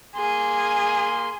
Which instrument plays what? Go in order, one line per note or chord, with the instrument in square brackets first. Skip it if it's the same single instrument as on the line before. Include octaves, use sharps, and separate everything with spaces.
[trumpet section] A#3 C6 [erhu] G#4